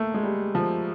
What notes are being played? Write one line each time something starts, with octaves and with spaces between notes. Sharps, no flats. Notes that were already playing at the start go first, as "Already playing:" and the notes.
Already playing: A3 A#3
G#3
G3
F3